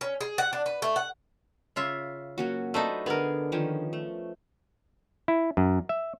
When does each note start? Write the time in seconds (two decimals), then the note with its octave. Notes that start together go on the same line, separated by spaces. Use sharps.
0.01 C#4
0.21 G#4
0.38 F#5
0.53 D4
0.66 B4
0.82 A3
0.96 F#5
1.76 C#3 F4 E5
2.38 F#3 A#3 C#4 F#4
2.74 A3 D4 D#4 B4 C5
3.06 D3 B3 G#4 A#4 G#5
3.52 D#3 F3 C#4
3.93 A3
5.28 E4
5.57 F#2
5.89 E5